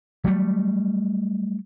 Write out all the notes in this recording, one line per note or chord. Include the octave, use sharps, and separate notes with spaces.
F#3 G3 A3